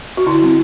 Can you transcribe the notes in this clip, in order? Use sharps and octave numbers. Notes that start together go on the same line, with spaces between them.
F#4
D3 E4
G3 C4